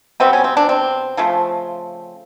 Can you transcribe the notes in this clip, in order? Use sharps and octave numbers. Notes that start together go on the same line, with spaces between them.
B2 G3 B3 C4
C#4
C4
D4
C4
C#3 F3 A3